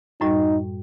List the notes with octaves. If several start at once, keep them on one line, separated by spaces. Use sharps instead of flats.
F#2 A2 G3 D#4